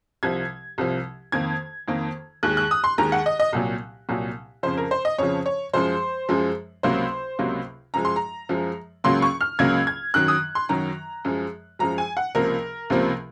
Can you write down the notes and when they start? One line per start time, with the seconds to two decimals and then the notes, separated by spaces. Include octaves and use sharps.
0.23 C2 C3 F3 G#6
0.78 C2 C3 F3
1.32 F2 D#3 A#3 G#6
1.88 F2 D#3 A#3
2.43 D#2 D#3 G#3 F#6
2.57 F#6
2.71 D#6
2.84 C6
2.98 D#2 D#3 G#3 A#5
3.12 F#5
3.26 D#5
3.40 D#5
3.53 C2 A#2 F#3
4.09 C2 A#2 F#3
4.63 F2 C#3 F3 C5
4.77 A#4
4.91 C5
5.05 D#5
5.18 F2 C#3 F3 C#5
5.46 C#5
5.73 F#2 F3 G#3 C5
6.29 F#2 F3 G#3
6.83 C#2 C3 F#3 A#3 C5
7.39 C#2 C3 F#3 A#3
7.94 F#2 F3 G#3 A#5
8.05 C6
8.16 A#5
8.49 F#2 F3 G#3
9.04 C#2 C#3 F#3 A#3 C6
9.22 C#6
9.41 F6
9.59 C#2 C#3 F#3 A#3 G#6
9.87 G#6
10.14 F#2 D#3 F#3 F#6
10.28 D#6
10.55 C6
10.69 F#2 D#3 F#3 A#5
11.25 F#2 F3 G#3
11.79 F#2 F3 G#3 A#5
11.98 G#5
12.17 F#5
12.35 C#2 C3 F3 A#3 A#4
12.90 C#2 C3 F3 A#3